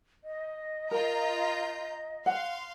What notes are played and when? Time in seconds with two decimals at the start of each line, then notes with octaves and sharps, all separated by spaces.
0.24 D#5
0.91 F4 A#4 A#5 G6
2.26 F5 F#5 C6